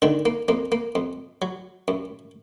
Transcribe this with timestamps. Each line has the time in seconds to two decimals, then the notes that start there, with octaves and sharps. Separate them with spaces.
0.02 D3 D#3 D4
0.26 A#3
0.48 F2 A#3
0.72 A#3
0.95 F2
1.42 F#3
1.88 F#2